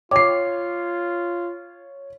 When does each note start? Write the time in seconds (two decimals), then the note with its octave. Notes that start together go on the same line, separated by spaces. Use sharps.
0.11 F4 C#5 G5 D6 C7